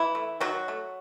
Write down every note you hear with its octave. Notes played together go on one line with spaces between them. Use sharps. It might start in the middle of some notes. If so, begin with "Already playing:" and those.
Already playing: E3 E4
A3
D#3 F#3 F#4
A3